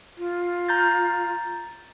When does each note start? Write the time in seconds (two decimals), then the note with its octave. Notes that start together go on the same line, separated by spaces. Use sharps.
0.18 F4
0.68 A#5 G6 A6